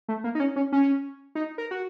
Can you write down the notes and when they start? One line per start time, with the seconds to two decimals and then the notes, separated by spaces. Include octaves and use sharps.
0.09 A3
0.24 A#3
0.35 D#4
0.40 C#4
0.56 C#4
0.72 C#4
1.35 D#4
1.58 A#4
1.71 F#4